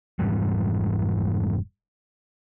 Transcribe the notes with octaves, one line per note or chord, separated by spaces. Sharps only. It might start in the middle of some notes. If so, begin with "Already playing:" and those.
F1 G#2 E3 G3